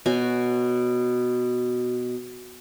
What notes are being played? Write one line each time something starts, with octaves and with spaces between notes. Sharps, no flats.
B2 F#4 C#5 G#5